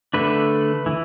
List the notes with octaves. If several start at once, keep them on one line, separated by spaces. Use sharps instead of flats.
D3 A3 D4 B4
E3